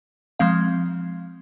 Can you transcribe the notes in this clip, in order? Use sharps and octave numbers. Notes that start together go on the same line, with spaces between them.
F3 G#3 C4 F5